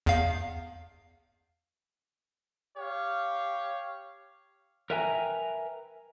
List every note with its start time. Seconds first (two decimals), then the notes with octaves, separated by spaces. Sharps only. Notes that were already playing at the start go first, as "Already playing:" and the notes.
0.06 E2 F5
2.76 G4 C#5 F5
4.90 A#4 B4 E5 G5 G#5 A#5